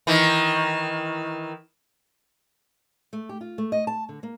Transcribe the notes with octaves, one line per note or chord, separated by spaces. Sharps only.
D#3 E3
A3
G4
F4
A3
D#5
A5
D3
A#3